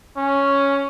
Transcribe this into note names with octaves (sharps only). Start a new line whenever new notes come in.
C#4